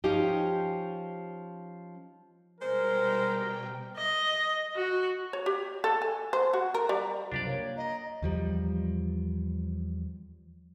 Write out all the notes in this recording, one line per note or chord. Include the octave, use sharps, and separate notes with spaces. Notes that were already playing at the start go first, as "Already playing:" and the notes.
F3 C#4 D#4 G4
B2 G3 G#3 A#4 C5 G5
D#5
F#4
C#5
G4
A4
G#5
C5
F#4
A#4
G3
C2 F#2 F3 D4 G4 D5
A#3 C#5
D#5 A#5
E2 F3 G3